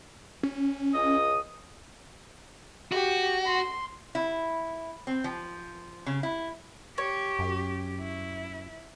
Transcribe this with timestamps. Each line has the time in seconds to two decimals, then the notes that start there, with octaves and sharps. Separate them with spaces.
0.43 C#4
0.94 C#2 D#5 D#6
2.92 F#4 G4
3.45 C6
4.15 E4
5.07 C4
5.24 F3
6.06 C#3
6.23 E4
6.98 G4 C#5
7.39 F#2
8.01 E4